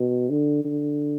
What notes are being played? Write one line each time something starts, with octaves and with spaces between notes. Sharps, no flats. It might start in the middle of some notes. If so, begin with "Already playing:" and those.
Already playing: B2
D3
D3